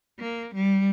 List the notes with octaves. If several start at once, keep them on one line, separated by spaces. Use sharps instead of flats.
A#3
G3